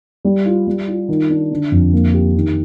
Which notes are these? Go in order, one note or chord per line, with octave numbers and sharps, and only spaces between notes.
G3
F4
G3
F4
D#3
D4
D3
F2
A#3
G4
D#3